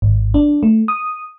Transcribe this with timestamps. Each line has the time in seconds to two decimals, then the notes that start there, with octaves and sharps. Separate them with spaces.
0.02 G#1
0.34 D4
0.63 A3
0.88 D#6